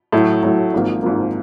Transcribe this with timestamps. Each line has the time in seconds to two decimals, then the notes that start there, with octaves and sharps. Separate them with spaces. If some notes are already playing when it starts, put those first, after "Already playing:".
0.12 A2 F#3 A3
0.43 A2 F#3 A3
0.73 G#1 G#2 F3 A#3
1.03 G#1 G#2 F3 A#3